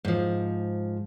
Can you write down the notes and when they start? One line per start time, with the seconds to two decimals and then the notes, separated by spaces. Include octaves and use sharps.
0.05 G#2 F3